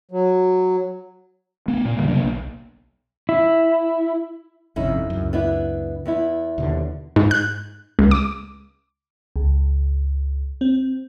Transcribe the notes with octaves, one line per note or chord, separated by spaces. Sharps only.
F#3
A3 B3
A#2
F2 D3 G3 A#3
C3 F#3 A#3 D4
B1
E4
G1 F2 C3 C#4 D#4 E4
C#2 F#2
B3 D4 E4
E2 B3 E4
D#2 B2 D3
G#2
F#6
C#2
D6
C#2
C4